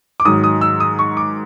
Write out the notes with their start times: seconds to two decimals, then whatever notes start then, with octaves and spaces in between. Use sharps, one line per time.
0.20 D6
0.25 G#2 D#3 F#3 D#6
0.44 D#6
0.61 E6
0.80 D#6
0.99 C#6
1.17 D6